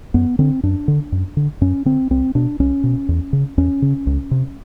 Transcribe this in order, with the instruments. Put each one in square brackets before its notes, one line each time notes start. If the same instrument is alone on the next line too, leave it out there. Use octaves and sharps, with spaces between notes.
[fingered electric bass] F#2 B3
D3 C4
F#2 D4
D3
F#2
D3
F#2 C#4
D3 C4
C2 C4
B2 D4
C2 C#4
B2
E2
C#3
E2 C#4
C#3
C#2
C3